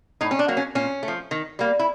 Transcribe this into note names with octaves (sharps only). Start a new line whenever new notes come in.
A2 D#4
C#4
D4
F#3 A#3
C#4
A#2 C#4
A3
F3
D#3
G3 A#3
E4